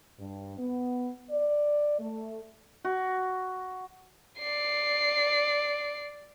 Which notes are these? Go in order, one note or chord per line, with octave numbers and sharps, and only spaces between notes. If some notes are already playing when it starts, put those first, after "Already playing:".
G2
B3
D5
A3
F#4
D5 C7